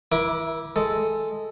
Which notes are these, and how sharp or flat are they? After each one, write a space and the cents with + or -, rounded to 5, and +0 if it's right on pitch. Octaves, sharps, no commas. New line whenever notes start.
E4 +0 A#4 +45 D6 +0
G#3 +0 A4 +0